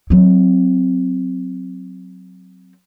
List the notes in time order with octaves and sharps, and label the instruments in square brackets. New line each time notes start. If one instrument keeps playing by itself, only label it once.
[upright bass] F#3 C4